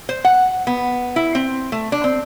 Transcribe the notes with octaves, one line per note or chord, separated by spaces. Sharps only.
C5
F#5
B3
E4
C4
A3
D4
C4